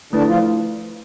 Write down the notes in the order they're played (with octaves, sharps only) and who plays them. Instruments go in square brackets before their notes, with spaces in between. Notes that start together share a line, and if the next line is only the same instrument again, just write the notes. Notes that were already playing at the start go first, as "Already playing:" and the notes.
[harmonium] D3 D4 [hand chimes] A3 E4 B4
[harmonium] F3 F4